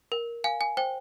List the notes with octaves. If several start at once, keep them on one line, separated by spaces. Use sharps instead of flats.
A#4
F5 G#5
G#5
C5 G5